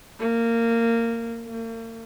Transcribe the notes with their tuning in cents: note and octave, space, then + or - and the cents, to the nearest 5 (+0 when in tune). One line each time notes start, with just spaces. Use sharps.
A#3 -15
A#3 -45